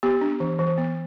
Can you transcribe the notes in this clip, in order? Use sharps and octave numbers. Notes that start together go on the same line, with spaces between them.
B3 G4
D4
E3
E3
B3